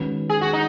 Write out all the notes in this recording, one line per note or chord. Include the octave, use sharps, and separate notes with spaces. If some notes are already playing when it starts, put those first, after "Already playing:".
Already playing: D#3 G#3 C#4 F#4 B4
G#4
F#4
D#4